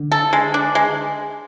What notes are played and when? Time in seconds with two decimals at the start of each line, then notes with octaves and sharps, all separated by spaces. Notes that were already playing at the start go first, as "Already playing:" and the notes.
Already playing: D3
0.12 A4
0.33 G#3
0.54 D4
0.75 G#3